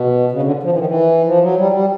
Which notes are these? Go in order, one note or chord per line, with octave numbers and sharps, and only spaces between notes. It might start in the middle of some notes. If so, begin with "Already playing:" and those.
Already playing: B2
C#3
D3
F3
E3
D#3
E3
F3
F#3
G3
G3